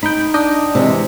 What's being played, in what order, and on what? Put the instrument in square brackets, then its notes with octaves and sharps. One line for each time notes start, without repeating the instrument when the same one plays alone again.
[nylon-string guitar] D#4 [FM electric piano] G5 B5
[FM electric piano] D4 D#5 G5
[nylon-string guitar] C3 E3 G#3